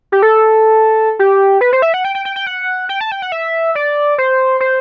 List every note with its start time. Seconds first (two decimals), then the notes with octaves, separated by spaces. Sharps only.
0.12 G4
0.22 A4
1.19 G4
1.61 B4
1.73 C5
1.82 E5
1.94 F#5
2.05 G5
2.15 G5
2.25 G5
2.36 G5
2.46 F#5
2.89 G5
3.01 A5
3.12 G5
3.22 F#5
3.32 E5
3.75 D5
4.18 C5
4.60 C5